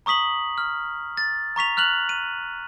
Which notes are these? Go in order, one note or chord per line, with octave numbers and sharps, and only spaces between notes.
A#5 C#6 D#6 B6 F#7
F6
A6
A#5 C#6 B6 F7
F6 F#6 F7 F#7
D#7